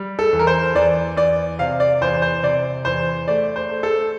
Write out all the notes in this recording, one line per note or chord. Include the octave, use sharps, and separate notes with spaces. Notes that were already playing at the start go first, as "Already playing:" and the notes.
Already playing: G3
A4
E2
A#4
C5
E2 D5
E2 D5
C3 F5
D5
E2 C5
C5
C3 D5
E2 C5
A3 D5
C5
A3
A4